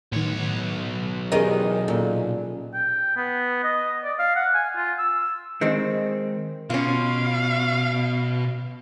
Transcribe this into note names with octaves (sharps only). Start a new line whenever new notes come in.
B1 A2 D#3 C#5
E2 D#3 C#4 G4 G#4 A#4 B4 D#5
A#2 A4
G5
B3
D#5
D5
F5
F#5
G#5
F4
E6
D#3 G#3 C4
B2 C#4 F4 F5